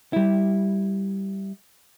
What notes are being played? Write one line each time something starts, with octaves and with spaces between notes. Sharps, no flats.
G3 E4